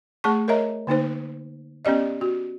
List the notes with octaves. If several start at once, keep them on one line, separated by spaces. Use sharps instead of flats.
A3 G#4 A5 C#6
A#4 C#5 D#5 E5 A#5
D3 A#3 D#4 C5
B3 C#4 G4 D5 D#5
F#4